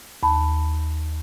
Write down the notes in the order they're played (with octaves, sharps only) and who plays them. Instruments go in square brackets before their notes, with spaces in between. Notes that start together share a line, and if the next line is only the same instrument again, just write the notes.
[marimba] D#2 A5 B5